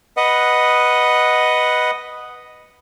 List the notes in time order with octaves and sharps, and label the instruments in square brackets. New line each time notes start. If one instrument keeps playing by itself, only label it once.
[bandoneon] B4 D#5 F#5